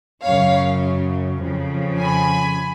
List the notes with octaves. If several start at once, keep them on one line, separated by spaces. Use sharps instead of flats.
F#2 C#3 F#3 C#5 F5
F2 C#3 F3
G#5 B5